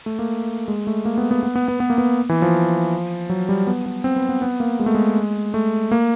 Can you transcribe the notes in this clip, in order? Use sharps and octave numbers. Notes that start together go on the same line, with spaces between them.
A3
A#3
G#3
A3
A#3
B3
B3
B3
B3
B3
B3
A#3
B3
E3
F3
F#3
G3
B3
B3
C4
B3
B3
B3
A#3
G#3
A3
G#3
A3
A#3